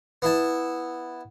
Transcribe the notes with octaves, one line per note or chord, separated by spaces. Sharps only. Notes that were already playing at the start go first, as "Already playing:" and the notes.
B3 E4 A5